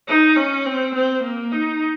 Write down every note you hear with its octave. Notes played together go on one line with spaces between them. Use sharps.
D#4
C#4
C4
C4
A#3
D#4